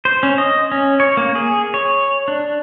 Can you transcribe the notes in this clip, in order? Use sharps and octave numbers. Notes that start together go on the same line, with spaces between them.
C5
C#4
D#5
C#4
C#5
A#3
G#4
C#5
D4